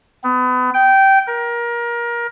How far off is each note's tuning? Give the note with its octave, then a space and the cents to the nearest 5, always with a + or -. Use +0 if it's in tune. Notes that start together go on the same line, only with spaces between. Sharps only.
B3 +35
G5 -15
A#4 +25